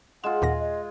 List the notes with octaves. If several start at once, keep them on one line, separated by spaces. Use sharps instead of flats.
G#3 F4 F#5 E7
D#2 A#2 A#6
D#5